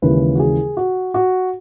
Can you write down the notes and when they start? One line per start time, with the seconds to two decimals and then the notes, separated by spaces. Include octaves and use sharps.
0.02 D#2 C#3 E3 G#3 B4
0.35 F#4
0.39 G#4
0.77 F#4
1.14 F#4